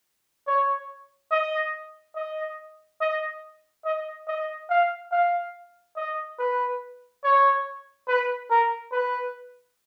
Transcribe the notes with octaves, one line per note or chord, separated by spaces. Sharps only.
C#5
D#5
D#5
D#5
D#5
D#5
F5
F5
D#5
B4
C#5
B4
A#4
B4